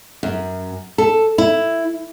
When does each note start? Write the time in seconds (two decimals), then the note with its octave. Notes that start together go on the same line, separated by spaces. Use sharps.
0.23 F#2
0.98 A4
1.38 E4